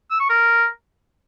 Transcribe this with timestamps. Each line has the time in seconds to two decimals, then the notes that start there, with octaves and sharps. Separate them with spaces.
0.10 E6
0.20 C#6
0.29 A#4